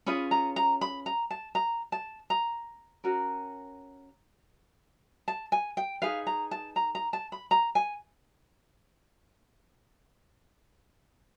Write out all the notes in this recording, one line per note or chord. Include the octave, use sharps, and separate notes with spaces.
C#4 F4 G#4 B4 B5
A#5
A#5
B5
A#5
A5
A#5
A5
A#5
C#4 F#4 A#4
A5
G#5
G5
D#4 G#4 B4 F5
A#5
A5
A#5
A#5
A5
B5
A#5
G#5